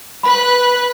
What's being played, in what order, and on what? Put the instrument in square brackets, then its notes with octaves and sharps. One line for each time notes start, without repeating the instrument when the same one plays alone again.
[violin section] B4 F#6 [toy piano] B5